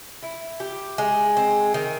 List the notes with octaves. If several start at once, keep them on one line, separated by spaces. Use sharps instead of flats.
E4
G4
G#3
C4
D#3